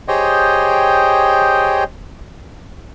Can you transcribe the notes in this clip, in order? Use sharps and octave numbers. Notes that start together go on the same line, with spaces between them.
G4 G#4 C5 C#5 D#5 G5